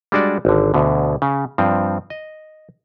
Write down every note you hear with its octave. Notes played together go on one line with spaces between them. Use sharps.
G3 G#3 D4 F#4 D5
G#1 D3
D2 B2 D3
C#3
G2 F3 C4
D#5